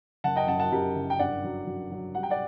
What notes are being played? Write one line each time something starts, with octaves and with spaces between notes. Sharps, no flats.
F#1 F#5 A5
D#5 G5
F#2 F#5 A5
F#5 A5
F#2 G4 A#4
F#1
G5
G2 D5 F#5
F#3
F#3
F#3
G3 F#5
G5
D5 F#5